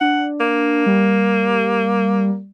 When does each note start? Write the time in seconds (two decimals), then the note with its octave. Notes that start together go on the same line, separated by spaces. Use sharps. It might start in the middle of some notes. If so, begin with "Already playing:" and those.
0.01 D4 F#5
0.41 A#3
0.86 G3